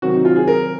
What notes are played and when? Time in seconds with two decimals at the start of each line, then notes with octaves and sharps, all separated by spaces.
0.02 C3 D#3 F#3 C4 F#4
0.13 D#4
0.25 F4
0.36 G#4
0.48 A#4